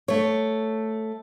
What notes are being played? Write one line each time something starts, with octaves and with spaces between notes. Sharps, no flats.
A3 C#5